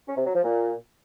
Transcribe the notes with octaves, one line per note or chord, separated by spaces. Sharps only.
C#4
C3
F#3
F3
A#2